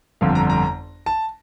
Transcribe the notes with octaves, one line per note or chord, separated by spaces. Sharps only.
G1 F2 D3 F5
A#5
A#5
A5